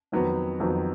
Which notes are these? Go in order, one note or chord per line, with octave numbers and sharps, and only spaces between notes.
F2 D#3 F#3 B3
F2 D#3 F#3 B3